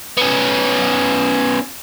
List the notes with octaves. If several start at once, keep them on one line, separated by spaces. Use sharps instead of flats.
B3 C#4